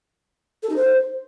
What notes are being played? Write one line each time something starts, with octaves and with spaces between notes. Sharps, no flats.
A4
D#4
C5